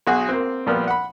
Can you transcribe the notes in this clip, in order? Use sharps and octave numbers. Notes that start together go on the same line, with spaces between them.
B1 F#4 G#4
A#3 C4
A#2 F3 G3 B3
F#5 B5